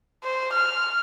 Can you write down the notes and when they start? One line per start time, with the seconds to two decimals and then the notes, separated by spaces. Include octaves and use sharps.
0.24 C5
0.53 F6